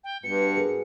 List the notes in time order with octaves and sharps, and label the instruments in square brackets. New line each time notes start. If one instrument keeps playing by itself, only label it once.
[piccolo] G5
[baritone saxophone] G2 [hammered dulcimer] B2 [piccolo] C#7
[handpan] G#4 A#4